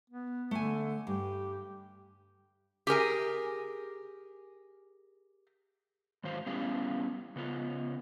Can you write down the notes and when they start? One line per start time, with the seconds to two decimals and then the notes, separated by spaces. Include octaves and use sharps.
0.10 B3
0.51 D3 A3 G#5
1.07 G2 G4
2.87 G4 G#4 A#4 G#5
6.24 G#2 D#3 F#3 C5 F5
6.46 G3 B3 C#4 E4 G4 F5
7.36 C#3 B3 F4